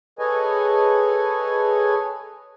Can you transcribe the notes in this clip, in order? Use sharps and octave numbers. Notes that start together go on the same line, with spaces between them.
G#4 A4 B4 C#5 D#5 G#5